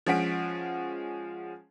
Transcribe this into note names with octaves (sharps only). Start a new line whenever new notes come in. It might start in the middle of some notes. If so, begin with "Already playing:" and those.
F3 G#3 C#4 F#5 B6 D7